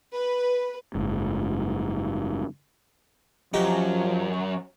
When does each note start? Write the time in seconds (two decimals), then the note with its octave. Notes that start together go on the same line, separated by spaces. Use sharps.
0.14 B4
0.95 F#1 G#2
3.54 F#2 F3 D#4 G4